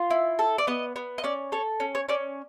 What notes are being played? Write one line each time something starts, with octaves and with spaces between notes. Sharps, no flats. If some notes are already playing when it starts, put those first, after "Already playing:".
Already playing: F4
E4
A4
D5
B3 D#5
B3
D#5
C#4 D5
A4 C#5
C#4
C#5
C#4 D5